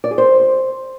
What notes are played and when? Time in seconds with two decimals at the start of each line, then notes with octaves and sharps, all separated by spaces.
0.04 D5
0.11 G#4
0.18 C5